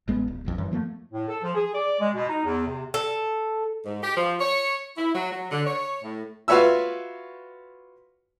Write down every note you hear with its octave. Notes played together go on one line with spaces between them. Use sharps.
A1 G#3 B3
D1
F1 B1 F2
F#2 E3
F3 G3 A3 A#3
A2
A4
F3
G#4
D5
G#3
B2
D#4
E2
C3
A4
G#2
G4
F3
C#5
E4
F#3
F#3
D3
C#5
A2
F4 F#4 B4 C#5 E5 E6